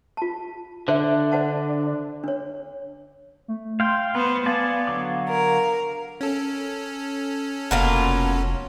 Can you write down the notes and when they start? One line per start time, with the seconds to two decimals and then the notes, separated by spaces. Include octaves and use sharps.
0.17 F4 A5
0.88 D3 D4 C5 E5
1.31 C5 F#5 A5
2.24 D4 C#5
3.48 A3
3.80 F5 G5 C6
4.15 B3 B4 C5
4.46 B3 D5 F5 G#5 A5
4.87 D3 F#3 D6
5.29 A#4
6.21 C#4 A4
7.71 F1 B2 A#3 F4